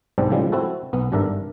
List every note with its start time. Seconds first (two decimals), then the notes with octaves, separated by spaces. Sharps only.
0.18 B1 G#2 G3 C4 D5 A5
0.30 A2 C#3 F3 G3 G#3
0.52 C4 E4 F#4 A4
0.93 B1 B3
1.12 G#1 G2 D4 A4 A#4 E5